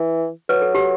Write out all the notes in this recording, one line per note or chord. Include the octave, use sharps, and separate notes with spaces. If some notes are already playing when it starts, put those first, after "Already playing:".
Already playing: E3
F#3 B4
A4
G4